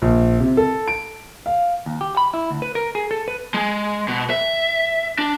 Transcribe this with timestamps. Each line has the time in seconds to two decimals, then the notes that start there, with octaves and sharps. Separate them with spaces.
0.02 A#1
0.40 C3
0.57 A4
0.88 D7
1.46 F5
1.86 D#2
2.01 G4
2.17 B5
2.34 E4
2.51 D2
2.62 B4
2.75 A#4
2.95 G#4
3.11 A4
3.28 B4
3.54 G#3
4.08 B2
4.30 E5
5.19 D4